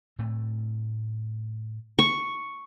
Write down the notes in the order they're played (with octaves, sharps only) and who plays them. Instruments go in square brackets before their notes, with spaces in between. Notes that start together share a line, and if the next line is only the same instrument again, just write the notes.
[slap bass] A2 A3 C4
[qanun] C#6